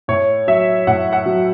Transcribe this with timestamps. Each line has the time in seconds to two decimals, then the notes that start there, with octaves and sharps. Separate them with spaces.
0.08 A2 C#5
0.47 F#3 E5
0.87 A2 F#5
1.13 F#5
1.26 F#3